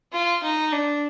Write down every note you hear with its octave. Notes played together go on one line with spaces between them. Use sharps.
F4
D#4
D4